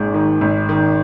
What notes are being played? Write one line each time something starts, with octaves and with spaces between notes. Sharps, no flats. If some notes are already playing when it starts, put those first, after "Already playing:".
Already playing: G#1 G#2
D#3
G#1
D#3